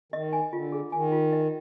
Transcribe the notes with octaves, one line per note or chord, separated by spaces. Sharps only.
D#3 D#5
G#5
D3 F4
G#4
D#3 G#5
F4
D#5